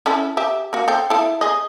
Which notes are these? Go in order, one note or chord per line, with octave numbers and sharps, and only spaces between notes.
C#4 E4 A4
G4 E5
A#3 F#4
A4 C5 G5
E4 A4
G#4 D#5